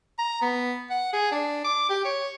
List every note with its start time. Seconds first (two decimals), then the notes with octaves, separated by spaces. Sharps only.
0.18 A#5
0.42 B3
0.90 F#5
1.13 G#4
1.31 D4
1.64 D6
1.89 G4
2.05 C#5